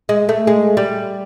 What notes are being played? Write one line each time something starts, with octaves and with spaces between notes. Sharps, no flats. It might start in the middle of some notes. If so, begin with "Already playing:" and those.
G#3
A3
G#3
G3